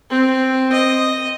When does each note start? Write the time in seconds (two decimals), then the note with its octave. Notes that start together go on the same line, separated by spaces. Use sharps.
0.10 C4
0.72 D#5